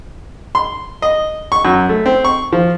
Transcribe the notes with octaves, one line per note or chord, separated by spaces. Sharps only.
C6
D#5
C#6
F#2
A3
C4
C#6
F3